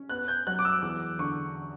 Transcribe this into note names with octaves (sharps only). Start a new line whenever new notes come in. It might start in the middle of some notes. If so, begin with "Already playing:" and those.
Already playing: C#4
B3 F#6
G6
F#3 F#6
D6
E6
E2 D6
D3 C#6